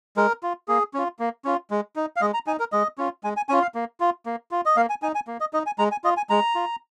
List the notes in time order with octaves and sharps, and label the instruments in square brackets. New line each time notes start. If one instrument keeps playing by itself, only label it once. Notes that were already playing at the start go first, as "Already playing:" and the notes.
[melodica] G#3 A#4
F4
A#3 G#4
C#4 F4
A#3
C#4 F4
G#3
D#4
F5
G#3 D#5
A#5
D#4 G#5
A#4
G#3 D#5
C#4 F4
G#3 G#5
G#5
C#4 F4 G#5
F5
A#3
F4
A#3
F4
D#5
A#3 F5
G#5
D#4 G#5
G#5
A#3
D#5
D#4 D#5
G#5
G#3 A#5
G#5
F4 D#5
G#5
G#3 A#5
F4